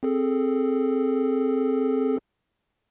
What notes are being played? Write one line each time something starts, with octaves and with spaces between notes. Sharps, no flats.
C4 G#4 A4